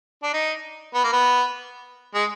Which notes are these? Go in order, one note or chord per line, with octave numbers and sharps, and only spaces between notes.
D4
D#4
B3
A#3
B3
G#3